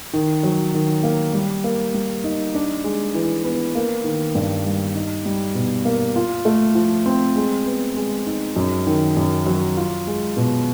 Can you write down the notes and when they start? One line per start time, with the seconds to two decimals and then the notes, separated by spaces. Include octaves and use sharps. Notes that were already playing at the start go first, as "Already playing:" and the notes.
0.13 D#3
0.43 F#3
0.74 D#3
1.03 A#3
1.33 G3
1.64 A#3
1.94 G3
2.24 D#4
2.55 D4
2.84 G#3
3.15 E3
3.44 B3
3.75 A#3
4.04 D#3
4.35 G2
4.65 G3
4.95 D#4
5.26 G3
5.55 B2
5.85 A#3
6.16 F4
6.45 A3
6.75 F3
7.06 C4
7.36 G#3
7.66 B3
7.96 G#3
8.26 D#4
8.56 F#2
8.86 D#3
9.17 F#2
9.46 F#3
9.77 F4
10.07 G#3
10.37 B2